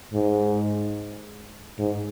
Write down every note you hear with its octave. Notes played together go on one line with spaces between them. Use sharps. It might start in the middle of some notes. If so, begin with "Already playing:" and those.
G#2
G#2